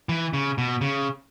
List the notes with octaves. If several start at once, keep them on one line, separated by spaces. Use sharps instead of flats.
E3
C#3
B2
C#3